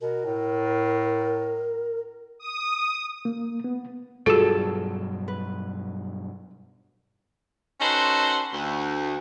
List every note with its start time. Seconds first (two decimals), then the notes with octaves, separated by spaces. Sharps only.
0.01 B2 A#4
0.25 A2
2.39 D#6
3.25 A#3
3.64 B3
4.26 G2 B2 F#3 F4 F#4 G#4 A4
5.28 B4
7.81 C#4 D#4 F#4 A4 B4 C5
8.54 D2